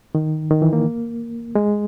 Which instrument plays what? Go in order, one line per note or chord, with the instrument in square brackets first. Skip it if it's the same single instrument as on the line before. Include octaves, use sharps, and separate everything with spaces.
[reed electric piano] D#3
D#3
E3
A#3
G#3